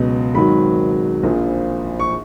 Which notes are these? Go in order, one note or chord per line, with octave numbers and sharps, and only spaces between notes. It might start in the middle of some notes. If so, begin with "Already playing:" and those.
Already playing: C#2 B2 F#3
G#1 G#2 D#3 F#3 B5
A#1 A#2 F3
C#6